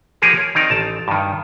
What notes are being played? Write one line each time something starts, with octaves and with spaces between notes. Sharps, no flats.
F3 A#3 G4 G#4 A#4 C#5
C#5
D#3 C4 D#4 D5 A#5
A1 A5
G2 D#3